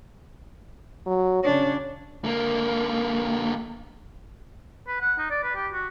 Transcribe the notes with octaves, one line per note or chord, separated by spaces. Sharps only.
F#3
C#3 D4 C#5
D3 A#3
B4
F#5
D#4
D5
B4
G4
F#4